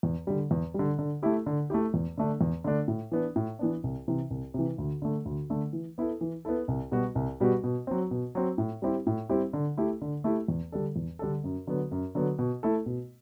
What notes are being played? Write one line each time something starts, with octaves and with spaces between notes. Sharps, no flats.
E2
D3 G3
E2
D3 G3
D3
A3 E4 G4
D3
A3 E4 G4
E2
D3 A3 D4
E2
D3 A3 D4
A2
E3 B3 D4
A2
E3 B3 D4
C2
C3 E3
C2
C3 E3
D2
D3 A3
D2
D3 A3
E3
B3 E4 A4
E3
B3 E4 A4
C2
B2 G3 B3 F#4
C2
B2 G3 B3 F#4
B2
F#3 C4
B2
F#3 C4
A2
G3 C4 E4 G4
A2
G3 C4 E4 G4
D3
A3 E4 G4
D3
A3 E4 G4
E2
D3 G3 D4 A4
E2
D3 G3 D4 A4
F#2
D3 F#3 B3
F#2
D3 F#3 B3
B2
A3 E4 A4
B2